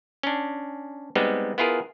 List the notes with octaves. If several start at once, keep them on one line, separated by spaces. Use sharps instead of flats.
C#4 D4
G3 G#3 B3 C4 D#4
B3 E4 F4 G#4 A#4